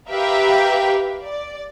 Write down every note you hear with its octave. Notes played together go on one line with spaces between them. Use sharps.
G4 A#4 B4 E5 F5 G5
D5